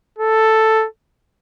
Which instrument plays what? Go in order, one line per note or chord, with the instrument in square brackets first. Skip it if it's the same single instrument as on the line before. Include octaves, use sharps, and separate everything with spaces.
[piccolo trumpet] A4